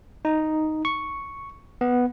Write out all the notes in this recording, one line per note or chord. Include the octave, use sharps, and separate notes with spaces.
D#4
C#6
B3